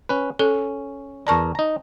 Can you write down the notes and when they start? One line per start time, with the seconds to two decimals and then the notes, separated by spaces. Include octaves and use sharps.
0.09 C#4 B4
0.39 C#4 A4
1.27 E2 A#4 D5 A5 A#5 C#6
1.55 D#4 A#5